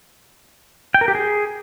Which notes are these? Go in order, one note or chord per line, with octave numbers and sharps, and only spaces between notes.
G5
A#4
G4
G#4